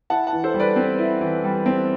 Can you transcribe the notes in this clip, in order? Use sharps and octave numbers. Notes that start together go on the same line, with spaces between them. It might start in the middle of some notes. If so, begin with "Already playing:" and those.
E4 F#5 A5
F#5 A5
E3
A4 C5
G3
B4 D5
C4
E4
E3
G3
C4